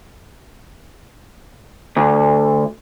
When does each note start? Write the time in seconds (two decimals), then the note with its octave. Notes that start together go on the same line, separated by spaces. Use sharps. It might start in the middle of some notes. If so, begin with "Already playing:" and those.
1.97 D2